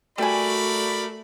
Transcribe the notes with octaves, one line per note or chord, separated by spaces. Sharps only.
G3 A3 F#4 A#4 D5 G#5 B5